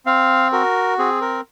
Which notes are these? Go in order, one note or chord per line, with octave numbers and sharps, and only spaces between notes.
C4 F5
F#4 A#4
C4 G#4
A#4